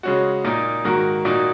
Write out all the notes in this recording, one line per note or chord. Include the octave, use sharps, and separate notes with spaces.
C#3 G#3 C#4 F#4
A#2 A#3 D#4 A#4
G#2 D#3 A#3 F#4 A#4
A#2 A#3 D#4 F#4